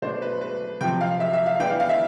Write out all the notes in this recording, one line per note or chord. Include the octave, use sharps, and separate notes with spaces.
B2 A3 D4 C5
B4
B4
C3 F3 C4 G5
F5
E5
E5
F5
E3 B3 D4 G5
F5
F5
E5